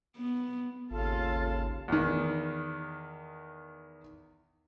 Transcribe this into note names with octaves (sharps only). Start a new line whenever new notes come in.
B3
G#1 D#2 C#3 F4 A4 F5 A5
E2 D#3